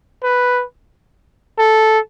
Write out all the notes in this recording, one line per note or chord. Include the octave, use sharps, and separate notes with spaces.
B4
A4